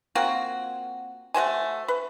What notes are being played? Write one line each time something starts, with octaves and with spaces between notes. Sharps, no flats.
A#3 C4 F4 F#4
A3 F#4 C5 G#5
B4